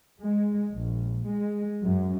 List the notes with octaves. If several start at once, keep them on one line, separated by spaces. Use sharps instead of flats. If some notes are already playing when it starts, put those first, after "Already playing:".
G#3
A#1
G#3
F#2